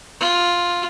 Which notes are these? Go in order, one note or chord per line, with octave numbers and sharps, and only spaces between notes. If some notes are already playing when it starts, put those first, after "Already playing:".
F4